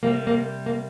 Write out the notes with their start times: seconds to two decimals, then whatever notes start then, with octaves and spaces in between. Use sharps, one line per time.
0.03 C3 G3 A#3
0.27 A#3
0.66 A#3